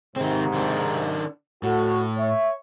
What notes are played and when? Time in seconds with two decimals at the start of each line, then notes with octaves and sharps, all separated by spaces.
0.16 G#2 C3 D#3 C4
0.53 D#3 D4
1.63 A2 F#4 A4
2.17 C#5 E5